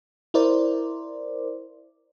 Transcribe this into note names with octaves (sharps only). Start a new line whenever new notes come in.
E4 A#4 C5 D5